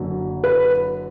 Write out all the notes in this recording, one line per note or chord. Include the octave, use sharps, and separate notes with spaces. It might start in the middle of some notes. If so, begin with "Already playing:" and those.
Already playing: F#1 F#2 D3
B4